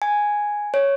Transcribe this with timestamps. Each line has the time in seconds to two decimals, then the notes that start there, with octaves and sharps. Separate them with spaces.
0.02 G#5
0.74 C#5